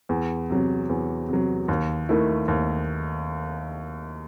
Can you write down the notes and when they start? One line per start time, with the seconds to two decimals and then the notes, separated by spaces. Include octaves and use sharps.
0.09 E2
0.50 C3 F#3
0.89 E2
1.29 C3 F#3
1.68 D#2
2.09 D#3 A3 E4
2.48 D#2